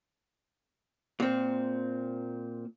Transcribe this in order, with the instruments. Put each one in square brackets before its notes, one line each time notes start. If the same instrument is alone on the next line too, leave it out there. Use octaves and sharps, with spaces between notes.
[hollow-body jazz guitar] A#2 C4